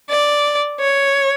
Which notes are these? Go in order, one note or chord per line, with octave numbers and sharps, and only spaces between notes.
D5
C#5